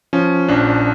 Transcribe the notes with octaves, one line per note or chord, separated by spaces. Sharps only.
F3 C#4
A#1 D4